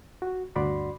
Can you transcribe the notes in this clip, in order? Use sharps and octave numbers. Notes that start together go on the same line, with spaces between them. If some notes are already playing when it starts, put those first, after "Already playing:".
F#4
D2 G2 F#4 D5 B5 C6